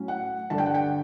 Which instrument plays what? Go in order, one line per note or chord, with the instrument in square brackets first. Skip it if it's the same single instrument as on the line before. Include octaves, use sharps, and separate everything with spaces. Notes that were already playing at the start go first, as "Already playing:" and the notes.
Already playing: [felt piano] A2 F#3 C#4
F#5
G2 D3 A3 D4 A5
G5
F#5
G5